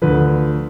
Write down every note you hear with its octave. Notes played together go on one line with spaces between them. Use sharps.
D2 D3 F3 B4